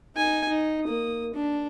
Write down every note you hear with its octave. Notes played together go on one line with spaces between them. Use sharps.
D#4 G#5
D#4
A#3 D#6
D4